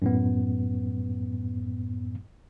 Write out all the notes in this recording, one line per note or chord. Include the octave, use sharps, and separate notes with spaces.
F#2 A2 B3